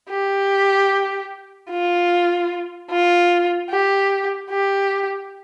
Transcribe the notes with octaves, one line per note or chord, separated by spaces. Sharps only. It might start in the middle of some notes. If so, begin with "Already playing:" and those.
G4
F4
F4
G4
G4